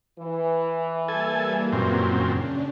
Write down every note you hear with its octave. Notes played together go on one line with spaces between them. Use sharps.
E3
G3 A#3 A4 G#5
F#2 A#2 C4
C#3 C#4 D4